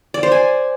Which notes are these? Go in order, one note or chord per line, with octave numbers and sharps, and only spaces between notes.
D5
C5
G#5